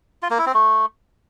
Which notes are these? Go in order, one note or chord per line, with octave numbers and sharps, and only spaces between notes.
F4
A#3
E4
C4
A3